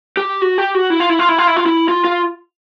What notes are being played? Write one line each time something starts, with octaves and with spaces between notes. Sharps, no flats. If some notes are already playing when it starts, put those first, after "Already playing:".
G4
F#4
G4
F#4
E4
F4
E4
F4
E4
F4
E4
F4
E4
F4
F4